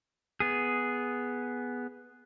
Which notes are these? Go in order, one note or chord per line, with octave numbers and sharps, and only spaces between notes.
B3 G#4